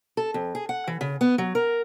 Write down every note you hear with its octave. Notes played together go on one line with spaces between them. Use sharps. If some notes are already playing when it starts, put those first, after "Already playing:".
A4
F2
G#4
F#5
E3
C#3
B3
F#3
A#4